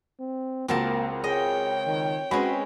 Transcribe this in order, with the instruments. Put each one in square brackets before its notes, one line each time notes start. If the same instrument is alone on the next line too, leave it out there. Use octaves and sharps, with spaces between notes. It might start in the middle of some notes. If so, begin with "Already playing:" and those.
[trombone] C4
[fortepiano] C#2 F#4 [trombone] A#3 [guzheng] C4 A#4 A5
[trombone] G#4 [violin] C#5 G5 [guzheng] D#5
[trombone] D#3
[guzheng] G#3 C4 C#4 [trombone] F#4 [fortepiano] G#4 B4 B5